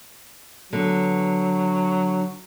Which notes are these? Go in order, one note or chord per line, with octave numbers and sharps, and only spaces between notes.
D3 F#3 B3